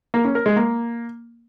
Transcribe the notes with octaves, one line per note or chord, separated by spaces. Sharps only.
A#3
C#4
A#4
G#3
A#3